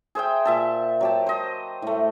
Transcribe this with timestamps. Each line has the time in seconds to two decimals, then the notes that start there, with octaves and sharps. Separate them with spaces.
0.15 G#4 C5 E5 G5
0.45 A#2 E5 A5
1.01 F#3 G4 A5
1.26 C5 D#5
1.82 A2 A3